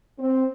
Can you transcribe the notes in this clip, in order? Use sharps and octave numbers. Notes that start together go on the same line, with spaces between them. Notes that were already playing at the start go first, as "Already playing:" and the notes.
C4